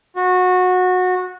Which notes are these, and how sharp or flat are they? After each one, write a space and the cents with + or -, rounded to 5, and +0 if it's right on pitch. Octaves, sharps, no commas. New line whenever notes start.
F#4 -20